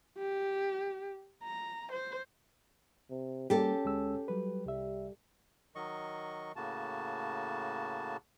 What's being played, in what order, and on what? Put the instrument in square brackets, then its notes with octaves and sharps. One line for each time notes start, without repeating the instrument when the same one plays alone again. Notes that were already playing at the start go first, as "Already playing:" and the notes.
[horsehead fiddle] G4
A#5
C5
[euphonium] C3
[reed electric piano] G3 A#3 [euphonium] C#4 [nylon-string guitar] G4 A4
[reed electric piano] D2 G#3 E6
F#3 G3 B4
[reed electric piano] C2 E5 [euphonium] G3
[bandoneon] D#3 F#3 D#5 C#6
A2 C#3 A#3 F#4 A5